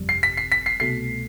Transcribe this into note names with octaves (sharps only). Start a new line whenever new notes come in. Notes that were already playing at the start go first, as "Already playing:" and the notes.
Already playing: G1 F2 C3 G3
C7
B6
C7
B6
C7
C2 B2 A3 C7